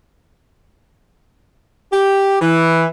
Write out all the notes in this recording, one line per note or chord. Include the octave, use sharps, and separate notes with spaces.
G4
E3